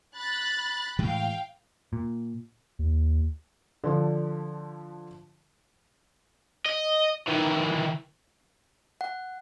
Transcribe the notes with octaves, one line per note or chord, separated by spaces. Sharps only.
B5 F#6 A6
A2 E3 G#3 F5 G5
A#2
D#2
D3 F3 D4
D#5
D#3 E3
F#5